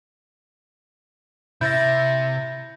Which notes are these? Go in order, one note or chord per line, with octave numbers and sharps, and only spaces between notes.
C3 E4 G6 A6 A#6